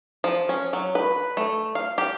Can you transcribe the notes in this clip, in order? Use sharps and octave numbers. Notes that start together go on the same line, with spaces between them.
F3
C#4
F#3
B4
A3
F5
G4